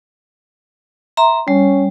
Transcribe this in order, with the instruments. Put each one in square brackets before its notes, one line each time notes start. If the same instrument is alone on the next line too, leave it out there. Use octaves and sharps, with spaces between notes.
[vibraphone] E5 A#5 C6
[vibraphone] G3 [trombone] C#4